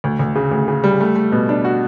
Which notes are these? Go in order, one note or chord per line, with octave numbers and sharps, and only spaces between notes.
D2
D2
C#3
D2
C#3
G3
A3
A3
B2
D4
F#4